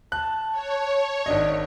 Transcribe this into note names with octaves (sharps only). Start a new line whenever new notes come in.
A5 F#6
C#5
G#1 D4 D5 D#5